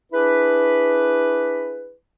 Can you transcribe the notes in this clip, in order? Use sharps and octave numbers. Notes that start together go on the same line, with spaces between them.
D4 E4 G#4 B4